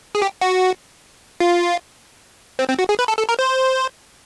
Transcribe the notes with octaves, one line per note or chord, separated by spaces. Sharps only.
G#4
G4
F#4
F4
C4
C4
F#4
G#4
B4
A4
A4
A#4
C5